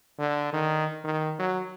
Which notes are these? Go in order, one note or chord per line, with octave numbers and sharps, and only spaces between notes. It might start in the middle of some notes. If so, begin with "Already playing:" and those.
D3
D#3
D#3
F#3